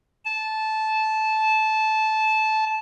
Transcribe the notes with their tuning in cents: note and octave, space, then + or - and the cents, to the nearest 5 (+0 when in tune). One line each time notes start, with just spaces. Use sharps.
A5 -15